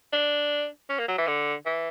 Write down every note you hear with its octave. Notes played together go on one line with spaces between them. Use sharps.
D4
C#4
A#3
F#3
E3
D3
E3